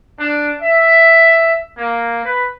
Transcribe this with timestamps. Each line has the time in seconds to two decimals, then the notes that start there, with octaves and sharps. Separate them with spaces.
0.19 D4
0.62 E5
1.78 A#3
2.24 B4